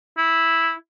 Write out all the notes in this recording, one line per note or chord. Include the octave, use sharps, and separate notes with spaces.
E4